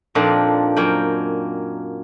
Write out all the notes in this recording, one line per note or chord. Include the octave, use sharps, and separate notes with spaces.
F2 A#2 F3 C4 D4 D#4
F#2 A#3 G5